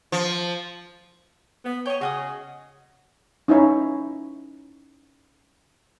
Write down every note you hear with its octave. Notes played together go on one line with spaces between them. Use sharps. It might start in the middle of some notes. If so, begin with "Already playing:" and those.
F3
B3
C#5 D#5 G5
C#3 F#4 G#4 D#5 D#6
C#4 D#4 E4 C#5